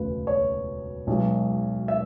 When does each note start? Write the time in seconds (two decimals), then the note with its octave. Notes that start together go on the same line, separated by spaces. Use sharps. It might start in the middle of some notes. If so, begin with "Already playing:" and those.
Already playing: E1 D2 C#3 B4
0.27 C#5
1.07 B1 B2 G#3
1.88 E5